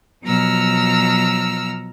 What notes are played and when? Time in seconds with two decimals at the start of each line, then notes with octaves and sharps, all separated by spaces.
0.24 B2 F3 F#3 A#5 E6 F6